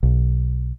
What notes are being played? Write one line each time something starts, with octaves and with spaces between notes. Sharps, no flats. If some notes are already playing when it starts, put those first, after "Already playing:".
B1